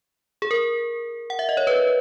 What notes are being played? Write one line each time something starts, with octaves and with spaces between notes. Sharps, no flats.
G#4
A#4
F#5
E5
D#5
C#5
B4